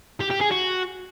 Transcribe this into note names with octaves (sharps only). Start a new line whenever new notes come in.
G4
G4
G#4
F#4